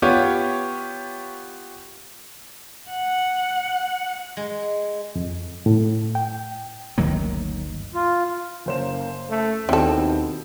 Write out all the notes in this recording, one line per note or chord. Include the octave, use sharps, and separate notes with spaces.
B3 F4 G4 C#5
F#5
G#3
F2
A2
G5
G1 D2 D#3 F#3 A#3
F4
F#1 A#3 C5 E7
A3
D#2 B2 E3 C4 A4 G5